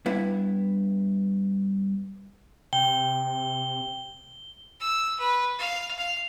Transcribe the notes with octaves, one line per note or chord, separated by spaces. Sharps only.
G2 B3 E4
C3 G5 G7
E6
B4
F5
F5